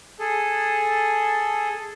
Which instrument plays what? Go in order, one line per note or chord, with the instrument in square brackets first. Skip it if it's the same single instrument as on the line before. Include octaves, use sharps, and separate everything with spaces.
[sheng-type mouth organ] G#4 A4